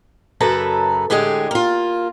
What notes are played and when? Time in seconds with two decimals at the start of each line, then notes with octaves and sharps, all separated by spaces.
0.40 F#2 C#3 A4 B4 E5 A#5
1.10 A2 D3 G#3 G4 G#4
1.51 A#3 F4